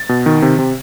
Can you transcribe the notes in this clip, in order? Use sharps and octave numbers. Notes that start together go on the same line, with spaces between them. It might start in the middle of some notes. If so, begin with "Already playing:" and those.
Already playing: A6
B2
D#3
C3
C3